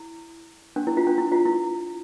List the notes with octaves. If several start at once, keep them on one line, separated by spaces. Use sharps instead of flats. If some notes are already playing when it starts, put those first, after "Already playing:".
Already playing: E4
D4
E4
F4
D4
E4
F4
E4